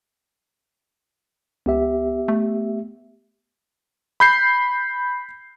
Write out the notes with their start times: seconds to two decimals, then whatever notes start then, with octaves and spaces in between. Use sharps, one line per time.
1.66 C#2 B3 G4 E5
2.28 A3
4.20 B5 G6 C7